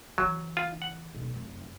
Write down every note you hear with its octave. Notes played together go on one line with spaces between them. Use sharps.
C#3 E3 F#3
F4
F#5
D#1 B1
F1 F#2